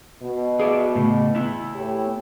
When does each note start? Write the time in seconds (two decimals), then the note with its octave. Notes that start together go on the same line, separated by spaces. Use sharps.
0.23 B2
0.60 G#4 D5 E5
0.95 A2 C#3
1.35 B3 E4
1.76 A2 G4 C#5